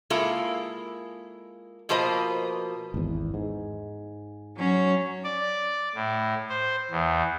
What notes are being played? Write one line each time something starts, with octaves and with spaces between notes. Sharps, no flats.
G#3 A#3 E4 F4 A4
B2 F3 A#3 B4 C5 D#5
G#1 E2
G#2
F#3 C#4
D5
A2
C5
E2